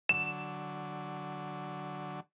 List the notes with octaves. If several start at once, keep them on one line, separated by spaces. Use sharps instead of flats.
D3 F#3 E7